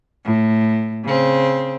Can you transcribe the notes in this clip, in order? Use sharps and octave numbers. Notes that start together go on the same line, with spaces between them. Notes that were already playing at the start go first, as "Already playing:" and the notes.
A2
C#3 C4